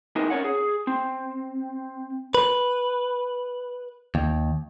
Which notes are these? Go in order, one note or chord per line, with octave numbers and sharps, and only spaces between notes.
C4 D#4 E4 G#4 A#4 B4
C#4 A#4 C5 C#5 F#5
G#4
C4
B4
D#2